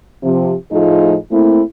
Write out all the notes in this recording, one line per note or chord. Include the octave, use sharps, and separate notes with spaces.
C3 F3
A2 F3 A3 D#4 F4 G#4
A3 A#3 C4 E4